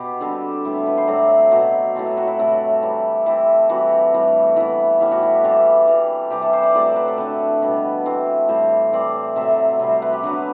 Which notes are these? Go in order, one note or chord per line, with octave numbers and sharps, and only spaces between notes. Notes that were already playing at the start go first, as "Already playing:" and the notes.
Already playing: B2 B3 G4
D3 G3 C4 A4
A2 G3 B3
B4
C5
A2 F#3 A3 C4 D5
B2 F#3 A3 C5
A2 F#3 A3 C4 B4
A4
F#4
E4
C3 F#3 A3 E4
E3 G3 C4
E3 A3 C4 E4
E3 G3 C4 F#4
A2 G3 C4
E3 B3 E4
A2 G3 B3 E4
F#4
E4
G4
E3 G3 C4 A4
E3 G3 C4
C3 E3 G3 G4
A4
C5
D5
A2 F#3 A3 C4 D5
C5
B4
A4
D3 A3 C4 B4
B2 G3 B3
E3 A3 C4
A2 G3 C4 C5
E3 A3 C4 D5
C3 F#3 A3 C4 E5
C3 G3 C4
C5
B4
G4
D3 F#3 B3 B4